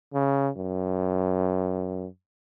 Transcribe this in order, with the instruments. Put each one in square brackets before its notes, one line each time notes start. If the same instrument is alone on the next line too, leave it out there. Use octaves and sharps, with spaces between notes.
[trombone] C#3
F#2